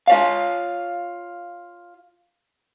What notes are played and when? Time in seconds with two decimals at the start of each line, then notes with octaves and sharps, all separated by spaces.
0.07 F4 C#5 F5